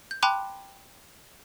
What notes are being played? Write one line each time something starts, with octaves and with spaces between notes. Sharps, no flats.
G6
G5 A5 B5 C6 D6 F#6